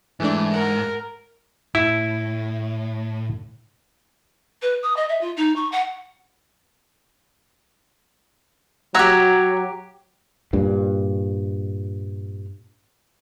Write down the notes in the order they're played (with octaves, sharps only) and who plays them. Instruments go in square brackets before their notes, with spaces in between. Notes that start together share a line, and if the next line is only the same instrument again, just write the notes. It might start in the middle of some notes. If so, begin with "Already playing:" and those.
[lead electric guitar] G#2 [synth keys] E3 A3 D4
[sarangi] A#4 [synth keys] F#5
[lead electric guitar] A2 [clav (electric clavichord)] E4
[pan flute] B4
D#6
D#5
E5
F4
D#4
C#6
F#5
[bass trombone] F#3 [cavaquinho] F#4 G4 [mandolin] C#5 E6 [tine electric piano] A#5
[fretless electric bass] G2 A#2